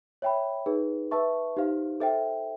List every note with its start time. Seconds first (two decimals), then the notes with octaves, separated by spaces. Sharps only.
0.22 C#5 E5 G5 B5
0.66 D#4 G#4 B4
1.11 B4 E5 A5 C#6
1.57 D#4 G4 C5 F5
2.00 A4 C5 E5 G5